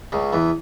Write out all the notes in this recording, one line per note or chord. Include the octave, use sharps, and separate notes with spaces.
C#2 C#3
E2 E3